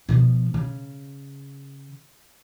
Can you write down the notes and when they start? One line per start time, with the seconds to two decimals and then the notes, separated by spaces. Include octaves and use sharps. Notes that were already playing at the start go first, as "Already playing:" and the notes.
0.09 B2 F3
0.54 C#3